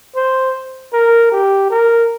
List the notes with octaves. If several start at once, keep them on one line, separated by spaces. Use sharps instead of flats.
C5
A#4
G4
A#4